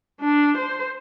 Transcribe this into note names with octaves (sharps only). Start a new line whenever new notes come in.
D4
C5